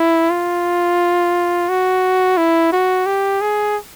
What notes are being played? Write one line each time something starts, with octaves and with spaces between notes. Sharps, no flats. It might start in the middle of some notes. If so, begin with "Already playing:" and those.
Already playing: E4
F4
F#4
E4
F#4
G4
G#4